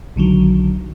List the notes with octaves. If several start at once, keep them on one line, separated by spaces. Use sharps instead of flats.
B1 D3 D#3 F#3